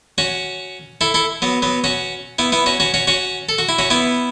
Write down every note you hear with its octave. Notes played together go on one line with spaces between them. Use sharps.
C#4 F#4
E4 A4
E4 A4
F#3 B3
F#3 B3
C#4 F#4
B3 E4
B3 E4
C#4 F#4
C#4 F#4
C#4 F#4
C#4 F#4
A4
F#4
E4
C#4 F#4
B3 E4